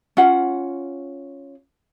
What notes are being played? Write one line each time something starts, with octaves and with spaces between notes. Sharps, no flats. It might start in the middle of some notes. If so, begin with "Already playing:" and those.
C#4 F4 F#5